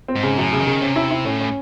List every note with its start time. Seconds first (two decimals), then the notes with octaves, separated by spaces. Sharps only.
0.08 C4
0.16 G#2
0.23 C#3
0.38 F#2 A2
0.53 C#3
0.60 D#3
0.67 C#3
0.82 C3 C#4
0.96 E4
1.11 E4
1.25 A2 C#4
1.40 C#4